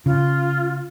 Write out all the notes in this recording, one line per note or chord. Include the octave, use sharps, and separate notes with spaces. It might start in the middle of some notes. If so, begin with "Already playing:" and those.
C#3 F4